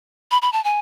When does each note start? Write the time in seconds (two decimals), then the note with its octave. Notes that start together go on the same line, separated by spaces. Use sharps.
0.31 B5
0.42 B5
0.53 A5
0.64 G#5